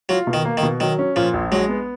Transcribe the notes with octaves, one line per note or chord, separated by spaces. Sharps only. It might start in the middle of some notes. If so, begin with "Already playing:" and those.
F#3 F4
B2
D#3
A#3
D#3
B2
D#3 F#3
C#4
A#2 F3
A#1
F#3 G#3
B3